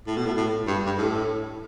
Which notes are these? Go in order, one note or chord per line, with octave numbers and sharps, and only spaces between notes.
A2
B2
A2
A2
G2
G2
A2